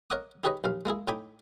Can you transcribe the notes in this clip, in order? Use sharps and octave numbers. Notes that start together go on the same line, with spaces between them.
A#4 C#5 D#5 F#5 D6 D#6
D#4 G4 G#4 B4 C#5 D#5
A#1 D#2 F5
G#3 A#3 E4 G#4
A2 D#4 G5 G#5 B5 D6